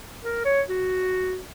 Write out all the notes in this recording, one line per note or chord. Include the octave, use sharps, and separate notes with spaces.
A#4
C#5
F#4